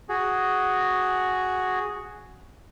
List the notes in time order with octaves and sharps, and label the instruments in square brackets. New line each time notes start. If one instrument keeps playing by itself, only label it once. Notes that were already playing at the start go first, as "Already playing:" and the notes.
[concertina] F#4 G#4